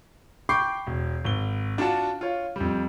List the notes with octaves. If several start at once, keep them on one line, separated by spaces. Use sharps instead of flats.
G5 B5 C#6 D6 G6 C7
E1
G#1 G7
D4 F4 F#4 A5
F4 C#5
F2 G3